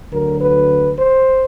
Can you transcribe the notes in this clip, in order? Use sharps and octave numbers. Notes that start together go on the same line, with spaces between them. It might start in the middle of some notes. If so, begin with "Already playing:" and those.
D2 D3 F#3 A#4
B4
C5